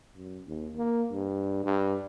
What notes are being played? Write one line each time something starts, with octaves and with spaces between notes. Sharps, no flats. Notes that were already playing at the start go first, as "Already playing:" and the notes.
F#2
D#2
A#3
G2
G2